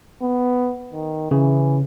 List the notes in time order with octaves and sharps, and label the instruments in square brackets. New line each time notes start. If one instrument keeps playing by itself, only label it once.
[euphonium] B3
D#3
[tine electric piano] C#3 [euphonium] E3